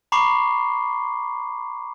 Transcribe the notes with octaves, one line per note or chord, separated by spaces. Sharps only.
A#5 B5 C#6 D6 C7